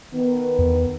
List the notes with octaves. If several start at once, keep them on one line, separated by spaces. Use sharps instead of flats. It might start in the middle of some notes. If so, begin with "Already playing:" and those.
D#3 B3
E2